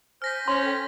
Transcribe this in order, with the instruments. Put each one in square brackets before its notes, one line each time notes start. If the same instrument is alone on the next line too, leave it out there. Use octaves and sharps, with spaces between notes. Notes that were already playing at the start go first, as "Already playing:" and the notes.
[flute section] C5 G#5 G6 [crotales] F6 A#6 B6
[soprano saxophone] C#4 [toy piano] C6
[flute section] A4 G5